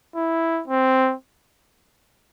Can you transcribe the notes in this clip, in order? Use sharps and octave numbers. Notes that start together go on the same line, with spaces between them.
E4
C4